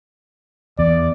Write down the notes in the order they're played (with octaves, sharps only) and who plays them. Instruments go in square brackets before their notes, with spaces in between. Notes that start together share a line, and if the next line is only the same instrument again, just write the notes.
[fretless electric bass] E2 [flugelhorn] D5